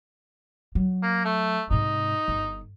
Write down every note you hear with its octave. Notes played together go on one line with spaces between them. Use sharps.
F#3
A#3
A3
G#2 C3 D#4
G1